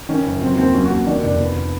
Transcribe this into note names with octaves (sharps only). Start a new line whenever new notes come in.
D#3 C#4
F#1
F#3 C4
D#2 C4
F#3 C#4
F#4
D#2
D#3 D4
F1 D4
F3 B3